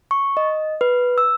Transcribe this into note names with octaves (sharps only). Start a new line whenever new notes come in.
C#6
D#5
B4
E6